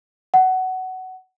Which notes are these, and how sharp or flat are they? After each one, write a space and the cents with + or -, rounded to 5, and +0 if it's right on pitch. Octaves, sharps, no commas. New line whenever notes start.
F#5 +15